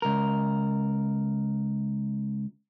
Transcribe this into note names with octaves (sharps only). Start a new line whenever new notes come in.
C#2 A#4